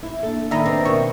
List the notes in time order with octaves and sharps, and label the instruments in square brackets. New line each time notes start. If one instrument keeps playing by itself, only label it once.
[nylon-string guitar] E4
[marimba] A#3 D4 [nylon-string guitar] A4
[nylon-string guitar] A#2 [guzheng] D#3 D#4 [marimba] D5 B5 [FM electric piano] E5 A#5
[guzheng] C4 [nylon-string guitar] D4 B4 D#5
[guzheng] B2 [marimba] A#4 D5 E5 [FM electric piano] C#6